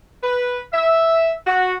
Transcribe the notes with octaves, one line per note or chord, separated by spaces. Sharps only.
B4
E5
F#4